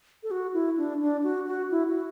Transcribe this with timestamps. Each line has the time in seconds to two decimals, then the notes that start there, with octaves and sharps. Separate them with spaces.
0.23 A4
0.31 F#4
0.54 E4
0.78 D4
1.01 D4
1.24 F#4
1.47 F#4
1.71 E4
1.88 F#4